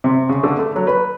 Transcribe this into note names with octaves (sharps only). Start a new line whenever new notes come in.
C3
C#3
D3
A3
F#3
B4